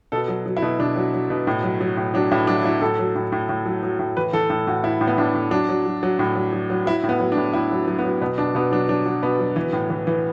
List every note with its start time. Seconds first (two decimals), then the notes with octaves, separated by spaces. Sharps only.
0.12 B2 A4
0.28 F#3
0.46 F#3
0.57 E4
0.62 B2
0.79 B2 D4
0.96 F#3
1.13 F#3
1.30 B2
1.47 A2
1.63 F#3
1.81 F#3
1.97 A2
2.14 F#3 D4
2.31 A2 E4
2.47 F#3 D4
2.64 F#3 E4
2.81 A2 A4
2.99 F#3
3.15 A2
3.32 A2
3.49 A2
3.66 F#3
3.83 F#3
3.99 A2
4.17 E3 B4
4.33 E3 A4
4.50 A2 A4
4.67 A2 F#4
4.83 A2 E4
5.01 A2
5.07 B3
5.18 A2 D4
5.34 A2
5.51 F#3 D4
5.69 F#3
5.86 F#3
6.03 F#3
6.19 A2
6.35 F#3
6.53 F#3
6.70 F#3
6.86 F#3 E4
7.03 A2
7.09 B3
7.20 F#3
7.32 D4
7.37 A2
7.53 A2 E4
7.72 F#3
7.88 F#3
7.99 B3
8.04 F#3
8.22 B2 B3
8.38 B2 D4
8.55 B2 B3
8.72 F#3 D4
8.88 F#3 D4
9.06 F#3
9.23 B2 B3
9.39 F#3
9.56 E3
9.73 A2
9.90 E3
10.07 E3